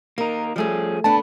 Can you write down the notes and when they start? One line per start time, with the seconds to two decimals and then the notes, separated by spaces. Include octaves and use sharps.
0.18 A#3 D#4 A#4
0.56 F3 G3 A3 C#4 G#4
1.04 A3 B3 D4 A5